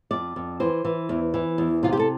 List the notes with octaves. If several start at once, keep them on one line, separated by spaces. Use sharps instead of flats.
F2 D5
F2
E3 C5
E3
E2
E3
E2
C3 F4
G4
A4